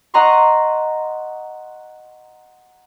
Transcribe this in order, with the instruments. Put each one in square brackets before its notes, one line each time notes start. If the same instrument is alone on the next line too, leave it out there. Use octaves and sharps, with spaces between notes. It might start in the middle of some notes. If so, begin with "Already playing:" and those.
[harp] D#5 F#5 A#5 C6 C#6